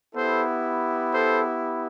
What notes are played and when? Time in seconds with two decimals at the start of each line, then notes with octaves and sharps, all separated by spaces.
0.14 B3 E4 G4 A4 C5
1.12 A4 C5